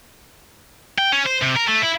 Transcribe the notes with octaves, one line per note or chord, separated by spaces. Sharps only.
G5
C#4
C5
C3
A#4
A3
E4